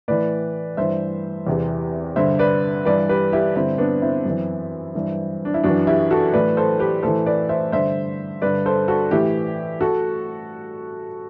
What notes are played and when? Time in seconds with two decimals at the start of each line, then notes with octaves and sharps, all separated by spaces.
0.08 A2 E3 B4 D5
0.77 G2 E3 C5 E5
1.47 E2 C3 E3
2.16 G2 D3 C5 E5
2.39 B4 D5
2.85 G2 E3 B4 D5
3.09 G4 B4
3.32 E4 G4
3.55 G2 D3 C4 E4
3.78 B3 D4
4.02 C4 E4
4.25 F#2 E3
4.95 G2 E3
5.45 D4
5.54 E4
5.64 F#2 E3 D4 F#4
5.87 E4 G4
6.11 F#4 A4
6.33 A2 E3 B4 D5
6.57 A4 C5
6.79 G4 B4
7.03 A2 E3 A4 C5
7.26 B4 D5
7.49 C5 E5
7.72 G2 D3 C5 E5
8.42 G2 D3 B4 D5
8.66 A4 C5
8.88 F#4 A4
9.11 A2 E3 E4 G4
9.81 F#4 A4